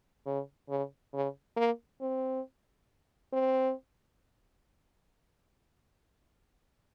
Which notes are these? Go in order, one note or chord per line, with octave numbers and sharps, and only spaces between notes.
C#3
C#3
C#3
A#3
C4
C4